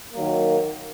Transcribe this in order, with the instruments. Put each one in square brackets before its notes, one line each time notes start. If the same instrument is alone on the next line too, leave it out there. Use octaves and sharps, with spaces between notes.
[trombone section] D#3 F#3 A#3